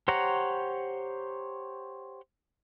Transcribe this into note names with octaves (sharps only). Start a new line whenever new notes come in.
G4 C5 C#5 F#5 A#5